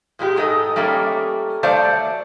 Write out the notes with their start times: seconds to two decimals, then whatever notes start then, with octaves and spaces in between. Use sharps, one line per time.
0.19 A#2 G#3 E4 G4
0.36 G#2 G#3 A4 D#5
0.76 G3 A3 A#3 C#4
1.63 F#3 A3 C5 D5 F5 A5